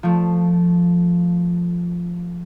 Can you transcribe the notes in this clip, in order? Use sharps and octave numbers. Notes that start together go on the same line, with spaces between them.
F3 A3